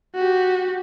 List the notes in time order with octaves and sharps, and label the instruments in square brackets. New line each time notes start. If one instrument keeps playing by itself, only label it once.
[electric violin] F#4 G4